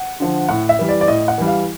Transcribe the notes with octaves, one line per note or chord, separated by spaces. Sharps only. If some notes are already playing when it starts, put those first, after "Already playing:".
Already playing: F#5
D3 F3
A2 F#5
E5
E3 G3
D5
D5
A2 D#5
F#5
E3 G3
F5